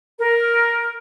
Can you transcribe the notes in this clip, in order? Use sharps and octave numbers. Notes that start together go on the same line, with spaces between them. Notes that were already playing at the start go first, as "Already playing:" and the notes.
A#4